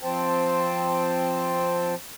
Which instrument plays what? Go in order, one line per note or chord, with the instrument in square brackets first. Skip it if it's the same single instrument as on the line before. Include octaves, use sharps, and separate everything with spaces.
[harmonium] F3 C4 C5 G5 A5